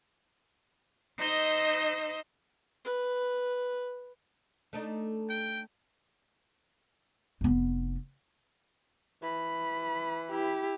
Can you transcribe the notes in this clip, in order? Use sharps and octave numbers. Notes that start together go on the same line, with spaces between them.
D#4 C5 D#5 E6 G6
B4
A3 D4 D#4
G5
F1 B3
E3 B5
E4 G4